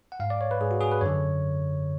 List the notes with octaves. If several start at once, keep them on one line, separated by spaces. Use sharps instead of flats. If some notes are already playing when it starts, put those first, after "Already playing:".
F#5
G#2 F5
D5
C#5
B4
G#2 G#4
F#4
G#4
B4
F#2 D3 C#5